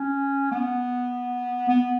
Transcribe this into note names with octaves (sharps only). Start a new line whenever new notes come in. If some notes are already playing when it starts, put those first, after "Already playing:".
Already playing: C#4
B3
B3